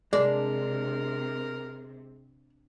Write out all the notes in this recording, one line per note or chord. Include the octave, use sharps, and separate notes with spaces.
C3 G#3 D4 A#4